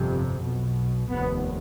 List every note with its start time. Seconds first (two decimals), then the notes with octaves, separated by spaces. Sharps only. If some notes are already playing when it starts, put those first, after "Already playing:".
Already playing: G1 F2 C3
0.42 B1 B2
1.09 F1 D#2 B3